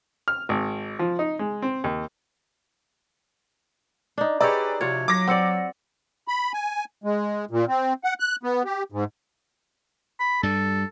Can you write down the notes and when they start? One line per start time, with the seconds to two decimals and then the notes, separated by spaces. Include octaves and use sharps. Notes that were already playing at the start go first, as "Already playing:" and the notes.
0.28 F6
0.49 G#1
0.99 F3
1.19 D#4
1.39 G#3
1.62 C4
1.84 D#2
4.18 D4 D#4
4.41 D#4 G4 G#4 B4 C#5 D5 A#5 E6
4.81 C3 F3 F4 F#4 C#5 G#6
5.08 F#3 D6 A#6
5.28 C4 D5 F#5 E6 C#7
6.28 B5
6.53 G#5
7.04 G#3
7.51 A#2
7.68 C4
8.04 F#5
8.20 F#6
8.43 B3
8.65 G4
8.92 G#2
10.20 B5
10.43 G2 G3 A4